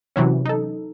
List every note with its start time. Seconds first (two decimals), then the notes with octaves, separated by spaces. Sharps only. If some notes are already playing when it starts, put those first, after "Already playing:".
0.16 C3 E3 F#3 C#4
0.46 D#4 A4